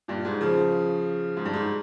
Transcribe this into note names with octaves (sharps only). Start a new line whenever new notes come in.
G2 A#2
G#2
C#3 F3
G#2
G2
G#2